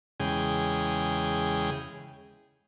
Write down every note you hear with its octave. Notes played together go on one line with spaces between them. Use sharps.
E2 C#3 G#3 G#4 G5